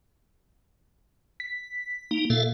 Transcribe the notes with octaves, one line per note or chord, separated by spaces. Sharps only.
B6
A#3 D#4
A#2 A4 E5 F5